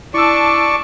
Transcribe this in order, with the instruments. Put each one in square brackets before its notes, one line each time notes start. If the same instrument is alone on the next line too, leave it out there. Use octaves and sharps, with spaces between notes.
[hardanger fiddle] D4 A5 [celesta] E4 E6 [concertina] D5 C#6